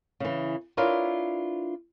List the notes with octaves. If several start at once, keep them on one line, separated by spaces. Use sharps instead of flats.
C#3 E3
D4 E4 F4 A#4 B4 C#5